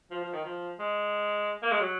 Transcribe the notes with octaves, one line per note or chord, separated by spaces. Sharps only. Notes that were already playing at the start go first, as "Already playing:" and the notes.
F3
F3
D#3
F3
G#3
A#3
G#3
F#3